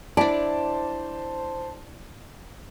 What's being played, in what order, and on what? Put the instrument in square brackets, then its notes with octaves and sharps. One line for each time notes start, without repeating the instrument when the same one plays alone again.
[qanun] D4 E4 [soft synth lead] C5 [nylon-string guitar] D5 [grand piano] A5